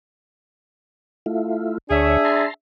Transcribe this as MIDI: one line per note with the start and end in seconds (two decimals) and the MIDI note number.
1.26 1.78 57
1.26 1.78 64
1.26 1.78 65
1.90 2.17 38
1.90 2.46 62
1.90 2.46 68
1.90 2.17 73
1.90 2.46 76
2.25 2.54 81
2.25 2.54 82
2.25 2.54 84